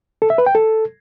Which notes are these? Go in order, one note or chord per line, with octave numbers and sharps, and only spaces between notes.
A4
E5
B4
G5
A4